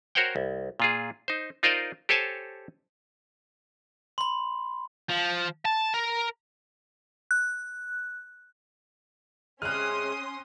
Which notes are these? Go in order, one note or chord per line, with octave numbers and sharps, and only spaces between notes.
F#4 A#4 C5 C#5 F#5 G5
C2
A#2 F4 G#4
D#4 C5
D#4 F4 A#4 C5 D5 D#5
G4 A4 C5 C#5 G#5 A5
B5 C6
F3
A5
A#4
F#6
C3 G#3 C#4 C6 D#6 F6 F#6 D#7